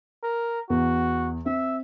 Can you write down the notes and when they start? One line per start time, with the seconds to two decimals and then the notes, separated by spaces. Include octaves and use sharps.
0.23 A#4
0.70 E2 F#4
1.46 C4 E5